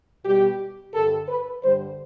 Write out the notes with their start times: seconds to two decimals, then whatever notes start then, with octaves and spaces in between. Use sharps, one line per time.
0.25 B2 G3 G4
0.93 G2 D3 G3 A4
1.28 B4
1.63 G2 D3 G3 C5